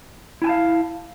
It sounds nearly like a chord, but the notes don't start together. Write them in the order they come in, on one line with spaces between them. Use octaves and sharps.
E4 G#5 A5 F5